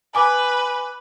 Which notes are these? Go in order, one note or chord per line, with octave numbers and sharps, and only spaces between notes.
B4 G#5 D6